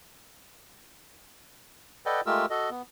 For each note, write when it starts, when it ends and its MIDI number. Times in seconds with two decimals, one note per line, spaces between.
2.06 2.21 69
2.06 2.21 71
2.06 2.21 74
2.06 2.21 75
2.06 2.21 78
2.06 2.21 79
2.26 2.46 56
2.26 2.46 57
2.26 2.46 65
2.26 2.46 67
2.26 2.46 70
2.26 2.46 88
2.50 2.70 66
2.50 2.70 69
2.50 2.70 75
2.70 2.82 59